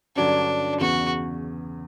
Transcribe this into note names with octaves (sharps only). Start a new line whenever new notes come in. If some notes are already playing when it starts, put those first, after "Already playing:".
G2 D3 F#3 C#4 D4
E2 C#3 E3 F#4